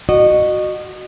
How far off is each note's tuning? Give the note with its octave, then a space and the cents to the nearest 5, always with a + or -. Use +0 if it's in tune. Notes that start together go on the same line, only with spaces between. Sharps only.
F#4 +0 D#5 -30